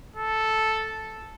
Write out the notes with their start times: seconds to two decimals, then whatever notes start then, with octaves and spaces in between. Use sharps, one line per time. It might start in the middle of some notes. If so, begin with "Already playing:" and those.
0.16 A4